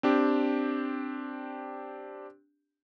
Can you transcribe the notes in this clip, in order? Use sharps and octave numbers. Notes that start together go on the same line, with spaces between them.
C4 D4 G4